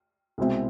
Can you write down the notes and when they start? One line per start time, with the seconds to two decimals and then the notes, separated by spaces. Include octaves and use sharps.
0.38 C2 B2 G#3 C4 E4